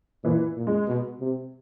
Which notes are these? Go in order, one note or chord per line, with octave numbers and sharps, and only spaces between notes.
A#2 E3
A#2
G#3
B2
C3